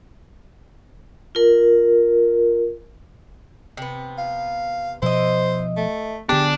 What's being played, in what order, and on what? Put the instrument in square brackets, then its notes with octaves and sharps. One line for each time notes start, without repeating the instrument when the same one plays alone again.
[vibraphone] F4 A#4
[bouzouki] C3 B3
[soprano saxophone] F5
[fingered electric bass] B2 F3 [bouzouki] E4 D#5 [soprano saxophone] C5
[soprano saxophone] A3
[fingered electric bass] D3 B3 [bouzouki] F3 G#4 [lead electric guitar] D4 [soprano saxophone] G4